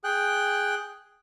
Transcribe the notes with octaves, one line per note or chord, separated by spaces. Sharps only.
G#4 G5 F#6